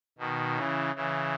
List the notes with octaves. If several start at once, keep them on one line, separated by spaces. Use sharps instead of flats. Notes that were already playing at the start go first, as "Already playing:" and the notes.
B2 D#3
C#3 E3
C#3 E3